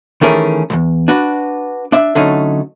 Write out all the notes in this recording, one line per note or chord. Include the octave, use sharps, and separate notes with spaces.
D#3 E3 A3 C#4 G#4 A#4
B1 E2
D4 F#4 B4
D4 E5
D3 F#3 A3 C#4 D#4